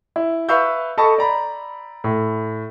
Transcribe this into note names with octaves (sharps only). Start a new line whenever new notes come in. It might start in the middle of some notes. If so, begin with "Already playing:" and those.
E4
B4 E5 F5 C#6 E6 G6
A4 D#5 A5 B5 C#6 A#6
D5 A#5 B5
A2